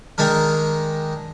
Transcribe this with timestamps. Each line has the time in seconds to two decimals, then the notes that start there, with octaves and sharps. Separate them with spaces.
0.18 D#3 G#3 D4 A#4